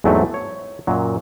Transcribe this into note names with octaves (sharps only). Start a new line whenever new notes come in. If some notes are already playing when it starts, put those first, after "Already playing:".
E2 G#2 F#3 A3 C4 D#4
C#5
F#2 A#2 F#3